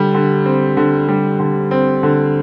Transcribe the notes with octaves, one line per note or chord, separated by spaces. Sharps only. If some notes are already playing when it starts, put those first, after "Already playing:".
Already playing: D3 G3
D3
C4
D3
G3
D3
C4
D3